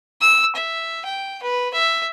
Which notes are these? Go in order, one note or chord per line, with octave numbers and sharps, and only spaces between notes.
E6
E5
G5
B4
E5